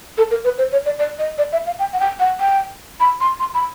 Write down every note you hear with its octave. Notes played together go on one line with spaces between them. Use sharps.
A4
A#4
B4
C5
C#5
D5
D5
D#5
D5
E5
F5
G5
F#5
G5
F#5
G5
B5
C6
C6
B5